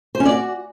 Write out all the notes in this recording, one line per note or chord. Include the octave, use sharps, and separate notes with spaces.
C5
C#4
D5
F#4